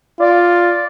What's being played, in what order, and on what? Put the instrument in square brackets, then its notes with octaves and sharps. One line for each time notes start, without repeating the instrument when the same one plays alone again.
[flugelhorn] F4 [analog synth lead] D5